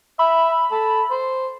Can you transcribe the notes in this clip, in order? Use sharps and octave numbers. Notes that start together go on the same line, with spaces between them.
E5 B5
A4
C5